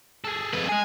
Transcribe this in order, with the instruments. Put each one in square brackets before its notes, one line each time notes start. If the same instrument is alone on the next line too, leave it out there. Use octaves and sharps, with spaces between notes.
[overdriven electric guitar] G#4 A4
[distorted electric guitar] F2 B4
[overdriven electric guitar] G#3 G#4 [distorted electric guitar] G#5